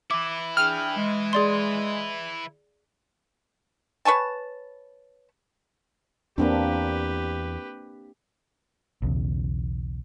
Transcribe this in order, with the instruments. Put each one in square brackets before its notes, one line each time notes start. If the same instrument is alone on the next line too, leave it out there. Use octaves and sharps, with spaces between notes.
[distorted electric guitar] E3 E4 [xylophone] D6
[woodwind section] D4 G#4 G5 [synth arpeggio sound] F6
[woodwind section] G#3
[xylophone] G#4 D5 C6
[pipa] B4 C#5 G#5 A5
[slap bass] E2 [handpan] A#3 C4 D4 [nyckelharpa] G4 B4
[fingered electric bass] B1 E2 C#3